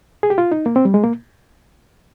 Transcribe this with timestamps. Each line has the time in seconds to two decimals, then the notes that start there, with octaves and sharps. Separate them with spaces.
0.23 G#4
0.30 G4
0.38 F4
0.52 D#4
0.66 A#3
0.76 C4
0.85 G3
0.94 G#3
1.04 A#3